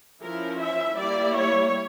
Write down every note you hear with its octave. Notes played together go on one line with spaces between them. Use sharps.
F3 C#4 E4 A#4
E5
G3 A#3 E4 D5
C#5